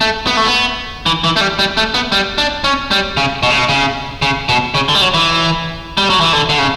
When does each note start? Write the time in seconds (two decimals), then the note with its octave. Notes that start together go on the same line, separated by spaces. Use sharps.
0.01 A3
0.27 B3
0.37 A3
0.46 B3
1.06 E3
1.24 E3
1.36 A3
1.41 G3
1.59 G3
1.77 A3
1.94 B3
2.12 G3
2.38 D4
2.64 C#4
2.91 G3
3.17 C#3
3.43 B2
3.50 C#3
3.58 B2
3.69 C#3
4.22 C#3
4.49 B2
4.75 C#3
4.89 D3
4.95 G3
5.02 F#3
5.14 E3
5.98 G3
6.10 F#3
6.21 E3
6.33 D3
6.49 D3
6.59 C#3